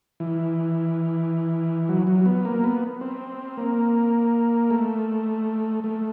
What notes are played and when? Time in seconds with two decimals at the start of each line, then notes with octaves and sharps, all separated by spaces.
0.20 E3
1.89 F#3
2.07 F#3
2.26 B3
2.45 A#3
2.64 B3
3.01 C4
3.57 A#3
4.70 A3
5.84 A3